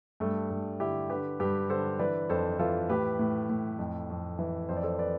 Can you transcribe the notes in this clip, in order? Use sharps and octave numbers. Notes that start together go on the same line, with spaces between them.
G2 A3
G2
D3 E4 G4
D3 G4 B4
G2 G4 B4
D3 A4 C5
E3 B4 D5
F2 A4 C5
E3 F4 A4
A2 G4 B4
A2
A2
F2
F2
E3
F2 C5
D5
A4 C5
B4 D5